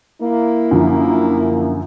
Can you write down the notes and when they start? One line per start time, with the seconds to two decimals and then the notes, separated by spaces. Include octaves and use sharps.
0.22 A#3 E4
0.71 F#2 D3 F3